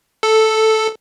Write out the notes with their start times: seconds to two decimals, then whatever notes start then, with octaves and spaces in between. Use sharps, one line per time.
0.23 A4